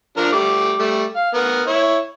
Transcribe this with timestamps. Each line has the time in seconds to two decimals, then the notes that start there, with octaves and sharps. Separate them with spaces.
0.17 F3 D4 A#4
0.32 G3 A3 D6
0.79 G3 A3
1.16 F5
1.34 B3 A#4
1.67 E4 C#5